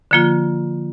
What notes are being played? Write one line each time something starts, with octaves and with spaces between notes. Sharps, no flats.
D3 F3 A#3 F4